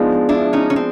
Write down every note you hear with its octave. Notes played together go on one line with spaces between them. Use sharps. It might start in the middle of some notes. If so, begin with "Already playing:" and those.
Already playing: F3 G#3 B3 D4 D#4
D4 E4
C#4 D#4
C#4
C4